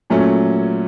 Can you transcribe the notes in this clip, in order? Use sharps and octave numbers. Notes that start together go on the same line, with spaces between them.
A#2 F#3 A3 C#4